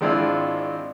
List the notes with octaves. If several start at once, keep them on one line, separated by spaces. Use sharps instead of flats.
G#1 G#3 C4 D4 E4 F4